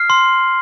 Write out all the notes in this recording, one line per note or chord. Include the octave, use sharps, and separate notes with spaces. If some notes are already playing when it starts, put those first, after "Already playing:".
Already playing: F6 C7
C6